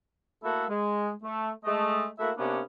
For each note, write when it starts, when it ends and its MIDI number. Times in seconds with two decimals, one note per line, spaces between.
0.43 0.65 57
0.43 0.65 58
0.43 0.65 64
0.43 0.65 66
0.43 0.65 69
0.43 0.65 76
0.70 1.10 56
1.23 1.50 57
1.65 2.06 56
1.65 2.06 57
1.65 2.06 75
2.19 2.31 57
2.19 2.31 58
2.19 2.31 64
2.19 2.31 66
2.19 2.31 76
2.37 2.60 48
2.37 2.60 58
2.37 2.60 59
2.37 2.60 61
2.37 2.60 62